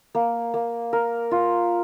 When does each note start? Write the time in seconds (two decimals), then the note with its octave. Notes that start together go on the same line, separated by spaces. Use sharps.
0.15 A#3
0.54 A#3
0.93 A#4
1.31 F4